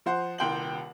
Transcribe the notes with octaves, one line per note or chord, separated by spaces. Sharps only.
F3 C5 F#5
D#1 C2 G5 C6 F#7